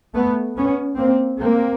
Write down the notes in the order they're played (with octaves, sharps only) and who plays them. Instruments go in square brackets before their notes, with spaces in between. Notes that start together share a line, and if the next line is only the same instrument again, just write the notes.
[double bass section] A3 B3
B3 C#4
A#3 C4
A#3 C4